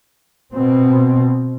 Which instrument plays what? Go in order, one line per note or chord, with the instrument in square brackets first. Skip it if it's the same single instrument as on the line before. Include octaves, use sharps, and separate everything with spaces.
[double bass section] B2 C4